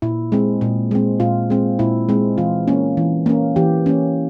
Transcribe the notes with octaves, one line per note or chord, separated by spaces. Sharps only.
A#2 E4
G#3 C4
A#2
G#3 C4
A#2 F4
G#3 C4
A#2 E4
G#3 C4
E3 F4
A#3 C#4
E3
A#3 C#4
E3 G4
A#3 C#4